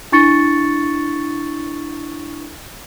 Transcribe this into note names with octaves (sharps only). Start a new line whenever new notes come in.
D4 E4 C#6 A6 C#7